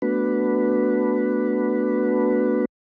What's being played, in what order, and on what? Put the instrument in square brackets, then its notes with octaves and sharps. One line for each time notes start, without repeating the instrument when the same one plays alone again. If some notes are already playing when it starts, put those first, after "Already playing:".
[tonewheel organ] A3 B3 D4 F#4 B4